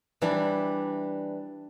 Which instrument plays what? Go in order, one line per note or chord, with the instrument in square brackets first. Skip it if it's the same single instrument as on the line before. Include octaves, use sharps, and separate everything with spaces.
[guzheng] E3 G3 D4